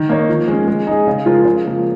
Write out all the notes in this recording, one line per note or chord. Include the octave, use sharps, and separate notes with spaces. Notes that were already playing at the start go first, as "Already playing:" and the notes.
Already playing: D#3
A#3 D#4 C#5
F3
G#3 C#4
G#3
D#4 G#4
C#3
F3 G#3 F4 A#4
C#3
F3 A#3